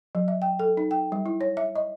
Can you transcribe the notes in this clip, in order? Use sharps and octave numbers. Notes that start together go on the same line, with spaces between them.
F#3
E5
G5
A4
D#4
G5
G3
E4
C#5
E5
D#5